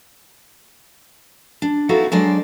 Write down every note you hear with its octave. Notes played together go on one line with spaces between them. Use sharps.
D4
B3 D#4 E4 F#4 A4 F5
F#3 G#3 D4 C5 D5